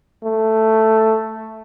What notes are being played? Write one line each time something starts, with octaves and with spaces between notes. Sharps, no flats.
A3